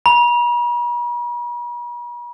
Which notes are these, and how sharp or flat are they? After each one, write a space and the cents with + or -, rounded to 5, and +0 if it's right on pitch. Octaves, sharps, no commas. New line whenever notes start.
B5 -45